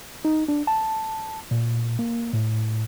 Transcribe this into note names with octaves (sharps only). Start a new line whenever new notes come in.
D#4
D4
A5
A#2
A#3
A2